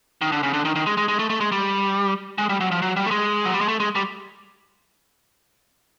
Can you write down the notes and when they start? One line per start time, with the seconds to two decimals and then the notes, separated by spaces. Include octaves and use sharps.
0.22 D#3
0.32 D3
0.43 C#3
0.53 D3
0.65 D#3
0.75 D#3
0.86 G#3
0.97 G#3
1.08 G#3
1.19 A3
1.30 A3
1.41 G#3
1.52 G3
2.38 G#3
2.49 G3
2.60 F#3
2.71 F3
2.82 F#3
2.96 G3
3.06 A3
3.11 G#3
3.45 F#3
3.54 G3
3.61 G#3
3.68 A3
3.80 G#3
3.95 G3